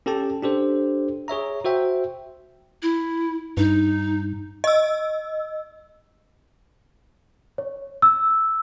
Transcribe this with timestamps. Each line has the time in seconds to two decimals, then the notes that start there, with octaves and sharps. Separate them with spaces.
0.06 C#4 G4 A4 G5 A5
0.42 D4 G4 A4 C5
1.28 G#4 C#5 E5 A#5
1.64 F#4 C5 E5 G5
2.82 E4
3.57 G2 D#4
4.64 D#5 E6
7.58 C#5
8.02 E6